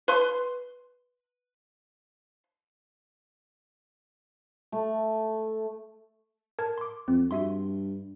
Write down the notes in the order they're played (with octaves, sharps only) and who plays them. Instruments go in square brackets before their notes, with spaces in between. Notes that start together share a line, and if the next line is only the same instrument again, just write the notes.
[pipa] B4 C6
[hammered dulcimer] A3
[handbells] A#4 A5 G#6
C6 D6
[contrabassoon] F2 [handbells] C4
[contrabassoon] G2 [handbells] F#4 E5 C6